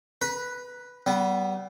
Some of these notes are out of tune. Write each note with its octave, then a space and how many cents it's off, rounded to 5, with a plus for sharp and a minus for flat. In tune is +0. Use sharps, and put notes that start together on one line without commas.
B4 +0 A#5 +45
G3 -30 B3 +0